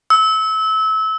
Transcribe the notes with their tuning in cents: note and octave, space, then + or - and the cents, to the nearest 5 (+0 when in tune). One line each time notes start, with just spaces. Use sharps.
E6 -25